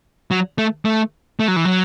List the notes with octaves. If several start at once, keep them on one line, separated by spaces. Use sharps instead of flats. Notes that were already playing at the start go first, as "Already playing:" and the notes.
F#3
A3
A3
A3
F#3
E3
F#3